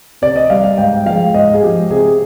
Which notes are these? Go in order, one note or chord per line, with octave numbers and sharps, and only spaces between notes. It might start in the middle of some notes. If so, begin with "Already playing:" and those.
C3 D5
D#5
G3 F5
F5
G#2 G5
F3 G#3 F5
G#2 D#5
G#4
F3 G#3 G4
C3 G#4